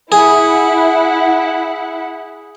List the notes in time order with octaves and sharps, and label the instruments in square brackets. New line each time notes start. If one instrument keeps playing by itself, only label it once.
[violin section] E4 F#5 [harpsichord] G#4